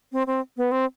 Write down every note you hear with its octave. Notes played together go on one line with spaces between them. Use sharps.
C4
C4
B3
C4